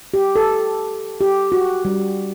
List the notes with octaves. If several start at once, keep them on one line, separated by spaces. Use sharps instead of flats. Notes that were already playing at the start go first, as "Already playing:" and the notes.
G4
A4
G4
F#4
G3